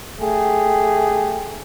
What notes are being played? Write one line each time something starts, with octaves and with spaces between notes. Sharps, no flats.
A3 G4 G#4